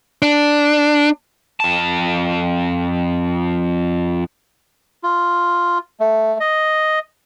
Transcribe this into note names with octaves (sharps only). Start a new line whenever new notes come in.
D4
F2 A5
F4
A3
D#5